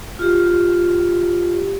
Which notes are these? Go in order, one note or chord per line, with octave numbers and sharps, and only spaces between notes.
F4 G4